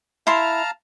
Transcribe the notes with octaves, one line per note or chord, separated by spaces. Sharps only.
E4 F5 A5 A#5 C6